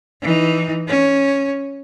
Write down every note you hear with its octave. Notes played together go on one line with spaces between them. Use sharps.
E3 D#4
C#4